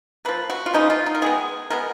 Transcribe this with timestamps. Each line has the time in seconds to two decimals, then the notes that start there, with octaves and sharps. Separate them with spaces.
0.25 F3 A#3 B4
0.50 F#4
0.66 F4
0.74 C#3 F3 A#3 D#4
0.90 F4
1.06 D#4
1.15 A#4
1.22 D#3 G#3 B3 G#4
1.70 B2 G#3 B3 A#4